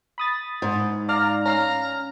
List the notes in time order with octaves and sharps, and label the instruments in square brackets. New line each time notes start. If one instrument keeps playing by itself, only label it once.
[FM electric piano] B5 D#6 A6
[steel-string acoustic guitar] G#2
[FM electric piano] D5 F5 F6 [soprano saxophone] A#5
[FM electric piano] C#4 F5 F6 [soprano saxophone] A#5